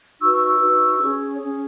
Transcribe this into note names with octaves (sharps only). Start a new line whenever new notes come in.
D#4 F#4 B4 C#6 E6
C#6 E6
C#6 E6
D#4 F#4 B4
C#4 G#4 C#5
C#4 G#4 C#5